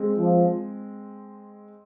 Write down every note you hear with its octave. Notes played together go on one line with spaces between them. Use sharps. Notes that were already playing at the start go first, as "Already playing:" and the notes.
Already playing: G#3 C4
F3